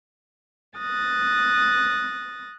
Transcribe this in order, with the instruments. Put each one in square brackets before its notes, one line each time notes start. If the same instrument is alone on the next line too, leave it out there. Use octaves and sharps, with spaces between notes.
[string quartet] D#6 F#6 A6 A#6